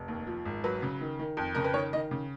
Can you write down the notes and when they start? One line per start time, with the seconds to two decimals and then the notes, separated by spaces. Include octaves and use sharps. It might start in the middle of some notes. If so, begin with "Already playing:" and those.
Already playing: F1
0.08 D#2
0.27 F3
0.45 G#1
0.64 F#3 B4
0.82 C#3
1.01 D#3
1.19 D#3
1.37 F2
1.55 C#3 A#4
1.64 B4
1.74 D#3 C#5
1.93 D#3 D#5
2.11 C#3